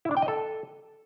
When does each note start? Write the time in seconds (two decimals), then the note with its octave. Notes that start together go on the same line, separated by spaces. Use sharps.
0.05 E4
0.11 D4
0.17 G5
0.22 D#5
0.28 A4